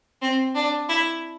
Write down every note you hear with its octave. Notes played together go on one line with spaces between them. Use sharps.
C4
D4
E4